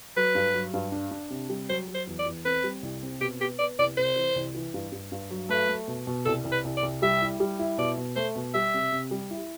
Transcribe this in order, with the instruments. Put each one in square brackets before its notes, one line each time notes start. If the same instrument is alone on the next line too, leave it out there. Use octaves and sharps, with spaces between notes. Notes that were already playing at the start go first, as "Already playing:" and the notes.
[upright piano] F#3 [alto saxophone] B4
[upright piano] G2
F#3
G2
D4
D4
C3
G3
[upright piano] F#3 [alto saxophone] C5
[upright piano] F#3
[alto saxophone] C5
[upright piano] E2
[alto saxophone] D5
[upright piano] E2
[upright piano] C4 [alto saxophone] B4
[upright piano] G3
C2
C4
[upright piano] B2 [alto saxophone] G4
[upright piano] B3 [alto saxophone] G4
[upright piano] B3 [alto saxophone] D5
[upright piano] C2 [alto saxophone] D5
[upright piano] C3 [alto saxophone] C5
[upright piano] E3
C2
E3
G2
G2
G2
F#3
[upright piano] A3 [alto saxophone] B4
[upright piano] A3
B2
B2
[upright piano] C2 [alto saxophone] A4
[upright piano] C2
[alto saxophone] B4
[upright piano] C2
[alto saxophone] D5
[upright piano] C2
[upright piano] G3 [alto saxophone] E5
[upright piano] E4
G3
E4
[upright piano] B2 [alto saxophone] D5
[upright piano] B2
[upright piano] A3 [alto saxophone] C5
[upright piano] B2
[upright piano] G3 [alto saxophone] E5
[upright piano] C3
C3
G3
E4